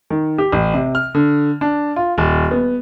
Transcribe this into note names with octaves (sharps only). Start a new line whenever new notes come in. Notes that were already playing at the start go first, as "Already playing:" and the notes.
D#3
G4
A1
C3
F6
D3
D4
F4
D#1
B3